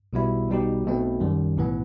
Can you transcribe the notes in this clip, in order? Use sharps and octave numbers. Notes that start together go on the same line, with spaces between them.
B1 B2 G3 B3 E4
B1 B2 G3 D#4 G4
B1 B2 A3 C4
F#2 D#3 G3
B1 A2 E3 B3